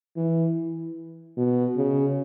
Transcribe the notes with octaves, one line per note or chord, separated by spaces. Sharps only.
E3
B2
C#3